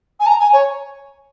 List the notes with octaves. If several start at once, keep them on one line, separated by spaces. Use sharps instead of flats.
G#5
A#5
G#5
C#5